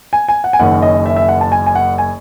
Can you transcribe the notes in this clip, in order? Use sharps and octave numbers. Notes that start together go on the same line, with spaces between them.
G#5
G#5
F#5
G#5
F#1 F#2 D#3 F#5
D#5
E5
E5
F#5
A5
G#5
G#5
F#5
G#5